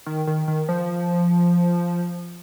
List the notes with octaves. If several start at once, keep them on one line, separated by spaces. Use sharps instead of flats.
D#3
D#3
D#3
F3